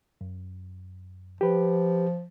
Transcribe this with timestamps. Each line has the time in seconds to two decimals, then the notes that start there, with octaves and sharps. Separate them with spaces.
0.21 F#2
1.41 F3 G4 B4